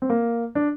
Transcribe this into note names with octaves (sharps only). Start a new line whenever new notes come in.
C4
A#3
D4